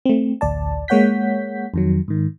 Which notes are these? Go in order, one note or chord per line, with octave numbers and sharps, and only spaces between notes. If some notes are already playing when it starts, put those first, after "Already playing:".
A3 C4
A1 D2 D5 A5
G#3 A#3 C#5 F#5 G6 B6
F2 D#3 F#3
G#2 D#3